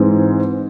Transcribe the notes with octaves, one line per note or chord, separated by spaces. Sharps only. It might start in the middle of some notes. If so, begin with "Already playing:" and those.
Already playing: G#2 E3 G#3 C4